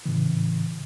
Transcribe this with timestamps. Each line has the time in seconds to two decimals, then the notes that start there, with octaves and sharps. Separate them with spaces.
0.06 A2 C#3 E3